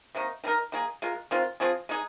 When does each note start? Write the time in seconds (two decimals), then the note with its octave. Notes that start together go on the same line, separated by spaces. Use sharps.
0.15 C3 D#3 A#3 D#4
0.44 D#3 C4 D#4 A#4
0.72 D#3 A#3 G#4
1.02 G#3 F4 A#4
1.31 D#3 G#3 C4 F4
1.60 F3 C4 F4 G#4
1.89 G#3 D#4 G#4